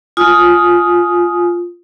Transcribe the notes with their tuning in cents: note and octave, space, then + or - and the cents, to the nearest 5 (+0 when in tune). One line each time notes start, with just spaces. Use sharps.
F4 +0 G#5 +20 D#6 +0